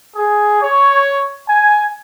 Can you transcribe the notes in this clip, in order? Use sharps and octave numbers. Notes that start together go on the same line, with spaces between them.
G#4
C#5
G#5